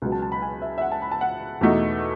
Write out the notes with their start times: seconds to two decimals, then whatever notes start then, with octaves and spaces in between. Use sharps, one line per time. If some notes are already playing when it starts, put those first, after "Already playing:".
0.02 C#2 B2 F#3
0.12 A5
0.22 A5
0.32 B5
0.42 G#5
0.62 E5
0.78 E5
0.82 F#5
0.92 A5
1.02 B5
1.12 A5
1.21 F#5
1.61 E2 B2 A3 D#4